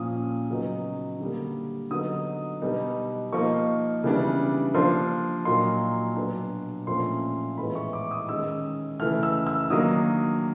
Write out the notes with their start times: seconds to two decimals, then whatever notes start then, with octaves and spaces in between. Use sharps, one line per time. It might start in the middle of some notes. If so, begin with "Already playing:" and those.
Already playing: A#2 F3 A#3 C#4 D#6
0.49 C#3 F#3 B3 D#4
1.20 D3 G3 A#3
1.91 D3 F#3 B3 D#4 D#6
2.62 B2 G3 B3 D#4
3.32 F3 A#3 D#4 C#6
4.03 C#3 E3 G3 B3 D4
4.75 F3 A#3 D4 C6
5.45 A#2 F#3 A#3 D#4 C6
6.16 B2 F#3 B3 D4
6.87 A#2 F3 A3 C#4 C6
7.58 A2 E3 G#3 B3 B5
7.75 C#6
7.93 D6
8.11 D#6
8.29 D#3 G#3 C#4 E6
8.99 C#3 E3 A3 F6
9.23 E6
9.47 E6
9.70 D#3 F#3 A#3 D4 D#6